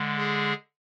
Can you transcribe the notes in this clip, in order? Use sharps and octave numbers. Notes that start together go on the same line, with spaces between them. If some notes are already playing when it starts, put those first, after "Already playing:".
Already playing: D3 G#3
G#4